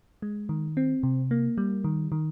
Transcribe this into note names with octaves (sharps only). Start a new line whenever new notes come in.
G#3
D#3
C4
C3
A#3
G3
D#3
D#3